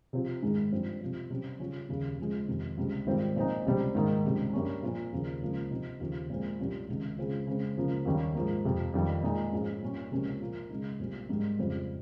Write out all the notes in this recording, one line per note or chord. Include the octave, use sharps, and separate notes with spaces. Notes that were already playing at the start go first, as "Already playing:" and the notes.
C3 F3 C4 F4
G#2 D#3 G#3 D#4
G2 F3 C4
C3 F3 C4
C3 G3 C#4
C#3 G3 C#4 F4
D#2 C#3 G3
C#3 F3 G#3
F2 C3 D#3
C#2 C3 G3
G#2 D#3 G3 C4 F4
A#2 F3 C4 D#4
C#2 C3 G3 C4
G#2 D#3 A#3 D#4
C#2 C3 G3
G2 G3 A#3 C#4
A#2 F3 C4 F4
D#2 C#3 F3 A#3
C#2 C#3 F3 A#3
C3 F3 C4 D#4
D#2 C#3 F3
A#2 F3 G#3 C4
C2 C3 G3 C#4 F4
C#2 C3 D#3
C#3 G#3 C4 F4
C#3 G#3 C4
C#2 C#3 F3 A#3
D#2 D#3 G3 C#4
G#2 F3 A#3
F2 C3 F3
F2 D#3 G3
A#2 G#3 D#4
G#2 F3 G#3 C#4 F4
A#2 G3 C#4
C#2 C3 F3 A#3 C#4
A#2 F3 A#3 F4
C#3 G#3 D#4
C2 A#2 G3 C4
G#2 G3 A#3 D#4
F2 C#3 G3 C4 F4